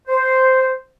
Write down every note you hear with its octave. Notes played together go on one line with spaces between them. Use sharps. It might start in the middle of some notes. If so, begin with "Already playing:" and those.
C5